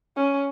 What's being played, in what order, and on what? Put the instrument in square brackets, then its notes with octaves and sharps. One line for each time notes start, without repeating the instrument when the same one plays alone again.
[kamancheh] C#4